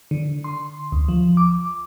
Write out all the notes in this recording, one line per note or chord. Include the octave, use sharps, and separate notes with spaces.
D3
C6
D2
F3
D6